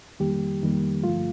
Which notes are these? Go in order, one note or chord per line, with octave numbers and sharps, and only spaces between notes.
F2 D#3 G3 A#3 G4
F2 D#3 G3 A#3
G2 D3 F3 A3 F4